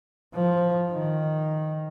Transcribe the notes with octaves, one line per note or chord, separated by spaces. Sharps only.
F3
D#3